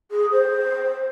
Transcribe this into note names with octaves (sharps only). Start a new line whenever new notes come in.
G#4
C5